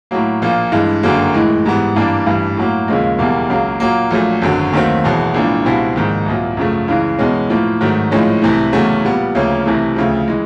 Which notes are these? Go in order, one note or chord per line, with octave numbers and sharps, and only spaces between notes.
A2 F#3 A#3
A#1 A#2 F3 A#3
G2 E3 G#3
F#1 F#2 D3 F#3 A#3
A2 E3 G#3
G#2 E3 G3 B3
G2 E3 G3 A#3 D4
A1 G2 E3 G3
A2 F#3 A#3
D#2 C#3 F3 G#3
F#1 E2 B2 G3 A#3
C#2 C#3 F#3 A#3
A#2 F#3 A#3
A#1 A#2 F#3 A3
G#1 F#2 D3 F#3
D#2 D#3 F#3 A3 C4
E1 E2 B2 F#3 B3
B1 A2 F3 A#3 D4
C#2 B2 G3 C4 E4
A#1 G#2 D#3
C2 A#2 F#3
F#2 C#3 F3 A3
C#2 C#3 E3
E2 B2 G#3 C#4
A2 F3 A#3
G#2 D#3 F#3 A3
A#1 A2 F3 G#3 C#4
C2 C3 E3 A3
E2 C#3 F#3 A3 C#4
A#2 G3 B3
D2 C#3 F3 A#3 C#4
C2 C3 E3 A3
D2 C#3 F3
E3 G#3